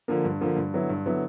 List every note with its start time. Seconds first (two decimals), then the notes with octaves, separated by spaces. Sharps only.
0.08 D3 F3 A#3
0.24 G2
0.41 D3 F3 A#3
0.56 G2
0.73 D3 F#3 B3 E4
0.89 G2
1.06 D3 F#3 B3 E4